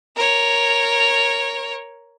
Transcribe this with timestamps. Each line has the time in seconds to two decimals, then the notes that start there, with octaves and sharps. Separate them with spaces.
0.16 A#4 C#5